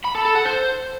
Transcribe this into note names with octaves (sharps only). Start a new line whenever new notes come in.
B5
A4
A4
F#5
C5